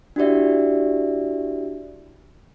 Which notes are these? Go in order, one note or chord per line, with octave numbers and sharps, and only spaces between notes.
D4 E4 F#4 G4 D5 E5